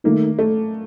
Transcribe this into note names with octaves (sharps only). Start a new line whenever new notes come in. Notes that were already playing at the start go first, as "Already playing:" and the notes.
D#3 A3 A#3 D#4
A3